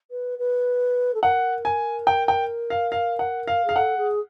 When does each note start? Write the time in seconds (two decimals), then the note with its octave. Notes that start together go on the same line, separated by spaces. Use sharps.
0.10 B4
0.38 B4
1.14 A4
1.23 A#4 F#5
1.65 G#5
2.07 G5
2.28 G5
2.70 F5
2.92 F5
3.19 F#5
3.47 F5
3.65 G#4 F5
3.76 A4 F#5
3.97 G#4